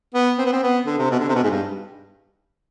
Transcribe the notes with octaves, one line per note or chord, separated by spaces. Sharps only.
B3
C4
B3
C4
B3
D3
C3
B2
D3
C3
B2
G#2
G2